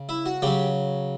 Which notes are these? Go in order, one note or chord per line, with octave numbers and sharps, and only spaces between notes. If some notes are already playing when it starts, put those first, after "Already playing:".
Already playing: C#3
E4
F#4
C#3 F#3 G4